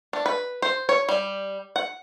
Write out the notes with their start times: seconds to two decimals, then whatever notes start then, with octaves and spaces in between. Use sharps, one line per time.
0.13 D4
0.26 B4
0.62 C5
0.89 C#5
1.09 G3
1.76 F#5